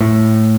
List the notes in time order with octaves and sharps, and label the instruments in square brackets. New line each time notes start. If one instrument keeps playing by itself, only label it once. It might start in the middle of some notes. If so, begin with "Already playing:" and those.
[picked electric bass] A2